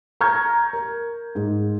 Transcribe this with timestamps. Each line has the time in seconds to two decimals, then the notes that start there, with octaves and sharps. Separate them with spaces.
0.21 A#5 C#6 F6 G6 G#6
0.73 A#4
1.35 G#2